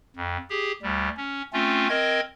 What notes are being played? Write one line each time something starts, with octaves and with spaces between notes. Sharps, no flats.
F2
G4 G#4
D2 G3
C#4
A3 C4 C#4 F4
C4 A#4 D#5 G#6